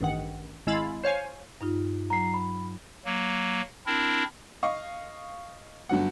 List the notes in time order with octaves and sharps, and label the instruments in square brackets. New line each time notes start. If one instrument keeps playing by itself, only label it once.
[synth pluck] A1 G2 D#3 F#5
G#1 G#3 E4 F5 B5 A6
C5 C#5 F5 G#5
[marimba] G2 D#4 F4
[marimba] F#3 [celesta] A#5 C7
[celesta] B5
[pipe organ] F#3 A#3
C4 D4 E4 A#4
[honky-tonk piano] D#5 F5 C#6
G1 D3 F#3 F#5